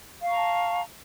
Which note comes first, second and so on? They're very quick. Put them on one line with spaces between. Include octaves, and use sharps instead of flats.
F5 C#6 A#5 A5